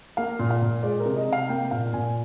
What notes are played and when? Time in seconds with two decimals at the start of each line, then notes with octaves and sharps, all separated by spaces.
0.17 A#3 F5
0.39 A#2
0.50 F5
0.62 A#2
0.83 G#3 D5
1.00 A#4
1.05 C3
1.16 D#5
1.28 C3 F5
1.49 A#3 G5
1.71 A#2 F5
1.93 A#2 G#5